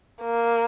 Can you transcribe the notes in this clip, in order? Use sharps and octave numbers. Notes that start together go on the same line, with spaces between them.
A#3